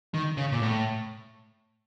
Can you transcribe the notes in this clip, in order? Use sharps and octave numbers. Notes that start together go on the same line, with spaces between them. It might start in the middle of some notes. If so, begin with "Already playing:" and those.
D#3
C#3
A#2
A2